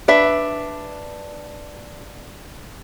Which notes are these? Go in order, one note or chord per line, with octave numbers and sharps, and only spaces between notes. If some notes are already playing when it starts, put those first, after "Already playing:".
D4 B4 E5